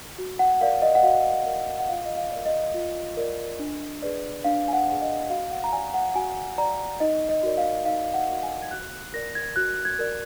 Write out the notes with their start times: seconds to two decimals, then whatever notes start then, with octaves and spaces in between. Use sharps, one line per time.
0.18 F#4
0.39 F#5
0.61 A#4 D5 F5
0.82 D#5
0.95 F#5
1.03 F#4 F5
1.46 A#4 D5
1.79 F#5
1.89 F4 F5
2.05 D#5
2.17 F5
2.31 A#4 D5
2.46 D#5
2.74 F4
3.17 A#4 D5
3.59 D4
4.02 G#4 B4 D5
4.44 D4 F5
4.68 G#5
4.73 F#5
4.87 G#4 B4 D5
5.02 D#5
5.30 F#4 F5
5.51 F#5
5.64 A#5
5.72 D5 G#5
5.94 F#5
6.15 F#4 G#5
6.58 D5 A#5
7.00 D#4 D#5
7.29 D#5
7.43 F#4 A#4 D5
7.58 F5
7.85 D#4 F5
8.14 F#5
8.29 F#4 A#4 D5
8.43 G#5
8.62 G#6
8.71 F#4 F#6
9.14 A#4 D5 A#6
9.35 G#6
9.56 F#4 F#6
9.85 G#6
9.99 A#4 D5